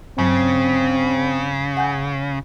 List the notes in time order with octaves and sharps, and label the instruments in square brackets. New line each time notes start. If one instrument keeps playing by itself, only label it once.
[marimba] G2 F#3 [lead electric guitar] C#3 [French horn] C4
[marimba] F#5 G#5 G6